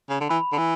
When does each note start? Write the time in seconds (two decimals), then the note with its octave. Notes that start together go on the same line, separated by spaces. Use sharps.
0.10 C#3
0.20 D3
0.29 E3 B5
0.52 D3
0.58 E3